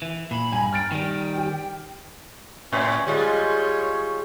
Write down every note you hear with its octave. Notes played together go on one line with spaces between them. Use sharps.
E3
A#2 B5
G2 G#5 A#5
G5 F6 A6 D7
D#3 G3 G5
G4
A2 C#4
G3 G#3 F4 C#5